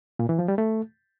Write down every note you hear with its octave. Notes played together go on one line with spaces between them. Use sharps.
A#2
E3
F3
G3
A3